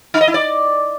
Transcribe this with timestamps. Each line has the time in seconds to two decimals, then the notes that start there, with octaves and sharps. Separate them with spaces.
0.14 D#4
0.21 D#5
0.27 E4
0.34 D5